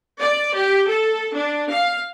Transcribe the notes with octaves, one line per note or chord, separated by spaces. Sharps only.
D5
G4
A4
D4
F5